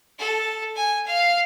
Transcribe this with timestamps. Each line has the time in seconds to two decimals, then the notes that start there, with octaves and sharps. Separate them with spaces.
0.19 A4
0.76 G#5
1.06 F5